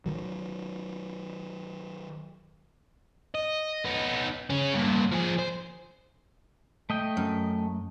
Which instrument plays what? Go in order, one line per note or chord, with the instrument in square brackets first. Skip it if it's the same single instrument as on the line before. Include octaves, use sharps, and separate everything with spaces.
[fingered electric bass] D#3 F#3
[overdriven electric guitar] D#5
B3 D#4
C#3 C#4
G2 A#2
F3 G#4
C5
[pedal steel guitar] A3 D#5 G5
[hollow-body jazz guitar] F#2